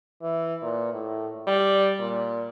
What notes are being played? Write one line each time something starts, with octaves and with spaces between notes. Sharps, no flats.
E3
A#2
A2
G3
A#2